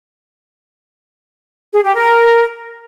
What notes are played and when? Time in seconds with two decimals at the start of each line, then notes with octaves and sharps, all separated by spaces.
1.73 G#4
1.84 G4
1.96 A#4